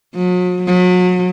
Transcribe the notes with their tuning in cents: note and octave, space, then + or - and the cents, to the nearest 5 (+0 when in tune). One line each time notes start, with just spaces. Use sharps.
F#3 -45
F#3 -35